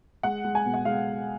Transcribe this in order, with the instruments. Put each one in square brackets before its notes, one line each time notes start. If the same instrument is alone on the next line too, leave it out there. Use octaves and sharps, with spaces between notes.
[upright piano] G#3 F#5
G#3
G#5
B2
F#5
G#3 F5